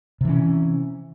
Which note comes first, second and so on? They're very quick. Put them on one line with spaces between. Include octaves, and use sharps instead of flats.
C3 E3 C#4